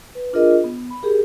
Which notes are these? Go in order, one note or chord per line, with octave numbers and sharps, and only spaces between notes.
B4
D4 F4 G#4 A#4 D#5
B3
B5
G4 G#4 A#4